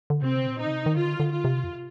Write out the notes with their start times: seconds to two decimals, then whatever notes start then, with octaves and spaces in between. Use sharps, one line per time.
0.10 D3
0.22 C3 C4
0.47 A#2
0.59 D#4
0.66 D3
0.71 C3
0.86 D#3
0.96 D3 F4
1.20 D3
1.32 F4
1.44 C3
1.64 F2